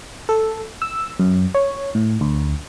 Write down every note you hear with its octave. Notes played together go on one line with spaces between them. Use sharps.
A4
E6
F#2
C#5
A2
D2